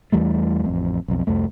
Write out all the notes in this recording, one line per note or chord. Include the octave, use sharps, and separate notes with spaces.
E2 E3 G3 A3
A1 F2
B1 F2
C2 F2 A3